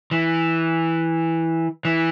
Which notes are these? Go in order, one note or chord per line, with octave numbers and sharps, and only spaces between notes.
E3
E3